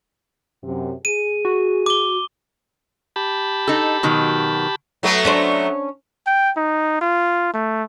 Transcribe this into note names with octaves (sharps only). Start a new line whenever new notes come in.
F#2 C3
G#4 D#7
F#4
D6 G7
G4 A5 B5
D#4 A4
B2 D#3 F#3
F#3 A3 B3
C#4 D4 C5
G5
D#4
F4
A3